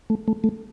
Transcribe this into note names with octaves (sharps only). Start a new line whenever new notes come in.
A3
A3
A3